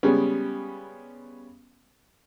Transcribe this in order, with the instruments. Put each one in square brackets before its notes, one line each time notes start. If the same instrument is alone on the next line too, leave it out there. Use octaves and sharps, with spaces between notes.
[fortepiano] C#3 G3 G#3 B3 C#4